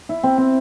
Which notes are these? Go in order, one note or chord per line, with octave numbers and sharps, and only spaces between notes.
E4
C4
C4